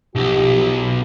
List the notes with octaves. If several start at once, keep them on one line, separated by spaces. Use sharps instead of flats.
B1 F3 G4